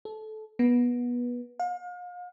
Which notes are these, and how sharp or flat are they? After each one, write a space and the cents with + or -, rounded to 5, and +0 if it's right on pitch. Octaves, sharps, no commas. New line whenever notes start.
A4 -20
B3 -20
F5 +40